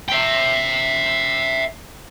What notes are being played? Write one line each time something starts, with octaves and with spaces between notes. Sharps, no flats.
E5 G5